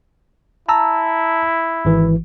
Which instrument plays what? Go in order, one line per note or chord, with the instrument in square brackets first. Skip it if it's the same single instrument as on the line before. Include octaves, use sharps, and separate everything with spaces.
[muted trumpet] E4 [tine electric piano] A5 A#5 E6
[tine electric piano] G#1 E3